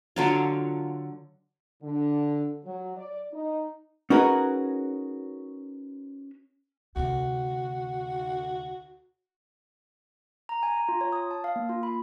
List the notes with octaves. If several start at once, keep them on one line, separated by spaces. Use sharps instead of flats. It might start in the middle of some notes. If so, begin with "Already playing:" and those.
D3 F#3 F4
D3
F#3
D5
D#4
C#4 D#4 F#4 G#4 A#4 B4
D2 C3 F#4
A#5
G#5
A#5
F4
C#5
D#6
A5
F5
A#3
F4
B5